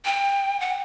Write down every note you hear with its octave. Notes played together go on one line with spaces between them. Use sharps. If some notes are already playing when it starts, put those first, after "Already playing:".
G5
F#5